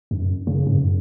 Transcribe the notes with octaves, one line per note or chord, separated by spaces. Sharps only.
F#2
C#3
G#2
F#2